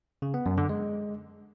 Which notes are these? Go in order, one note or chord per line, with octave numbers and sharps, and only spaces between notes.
C#3
B3
F#2
D3
G#3